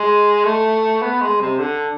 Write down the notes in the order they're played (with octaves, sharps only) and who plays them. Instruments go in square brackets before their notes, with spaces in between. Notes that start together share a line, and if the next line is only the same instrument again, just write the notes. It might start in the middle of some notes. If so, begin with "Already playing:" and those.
Already playing: [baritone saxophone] G#3
A3
B3
G#3
C3
D3